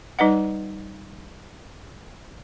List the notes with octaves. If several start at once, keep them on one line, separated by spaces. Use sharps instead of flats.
G3 D#4 B4 D#5 F#5